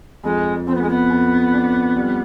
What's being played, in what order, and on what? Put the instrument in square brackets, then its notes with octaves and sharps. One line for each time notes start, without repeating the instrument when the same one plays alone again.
[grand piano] F2 [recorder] G#3
[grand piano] F2 [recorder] C4
[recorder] B3
G#3
B3
[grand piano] F2
D4
G3